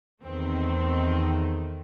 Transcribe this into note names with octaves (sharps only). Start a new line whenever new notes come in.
E2 D#3 A3 C4